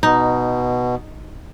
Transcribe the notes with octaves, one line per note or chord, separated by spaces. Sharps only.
B2 D#4